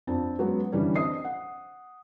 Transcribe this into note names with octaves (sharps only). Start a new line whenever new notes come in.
F2 C4 D4 A5
F#3 G#3 B3 C#4
D3 E3 G3 C#4
C4 D4 D#5 D#6 C7
F#5